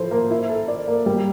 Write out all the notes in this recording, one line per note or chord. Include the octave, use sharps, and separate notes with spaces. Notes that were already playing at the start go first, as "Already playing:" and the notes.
Already playing: F3 E4 A4 C5
A#3
E4
A4
D5
A#3
G3